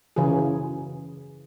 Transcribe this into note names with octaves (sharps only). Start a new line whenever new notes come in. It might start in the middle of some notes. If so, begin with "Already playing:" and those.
C#3 E3 F#4 G#4